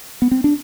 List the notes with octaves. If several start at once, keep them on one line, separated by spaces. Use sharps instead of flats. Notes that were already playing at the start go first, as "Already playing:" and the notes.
B3
C4
D4